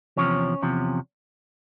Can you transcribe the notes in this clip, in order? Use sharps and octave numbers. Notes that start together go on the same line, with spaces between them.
E2 C3 F3 C#4 C#5
E2 C3 F3